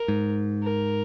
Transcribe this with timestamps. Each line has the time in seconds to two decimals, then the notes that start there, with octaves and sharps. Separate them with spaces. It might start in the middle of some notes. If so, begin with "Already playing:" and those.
Already playing: A#4
0.08 G#2
0.63 A#4